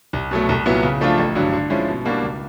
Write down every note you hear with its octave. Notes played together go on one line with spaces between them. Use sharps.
C2
B2 F#3 A3
C2
A#2 F#3 B3 E4
C#3
F3 A3 D4 F4
A1
G2 D3 F#3
D3
F3 G#3 C#4 E4
B2
G3 A#3 D4 F#4
C#2